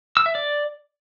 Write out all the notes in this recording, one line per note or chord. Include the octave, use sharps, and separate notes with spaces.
E6
E5
D5